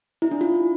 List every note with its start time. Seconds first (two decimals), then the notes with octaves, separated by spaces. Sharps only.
0.22 E4
0.31 D4
0.41 F4